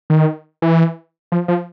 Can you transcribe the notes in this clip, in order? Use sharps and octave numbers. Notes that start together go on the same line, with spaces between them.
D#3
E3
F3
F3